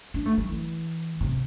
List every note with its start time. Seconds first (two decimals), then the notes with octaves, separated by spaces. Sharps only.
0.14 D4
0.25 A3
0.38 G3
0.49 E3
1.21 C3